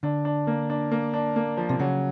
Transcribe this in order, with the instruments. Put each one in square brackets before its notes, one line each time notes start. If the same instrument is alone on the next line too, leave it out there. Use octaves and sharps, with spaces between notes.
[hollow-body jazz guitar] D3 [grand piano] D4
[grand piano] D4
A#3
D4
A#3
D4
A#3
F3
[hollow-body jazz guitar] C3
[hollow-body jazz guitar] C#3 [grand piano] F#3